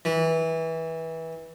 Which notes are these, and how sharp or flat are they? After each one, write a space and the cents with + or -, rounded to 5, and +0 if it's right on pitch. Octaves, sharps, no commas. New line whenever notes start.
E3 -20